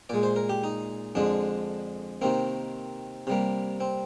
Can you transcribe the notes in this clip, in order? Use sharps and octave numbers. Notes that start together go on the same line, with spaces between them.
A#2 G#3 D5
C5
A#4
G4
D#4
F2 D3 G#3 D4
C3 D#3 A#3 C4
C3 G3 A#3
C4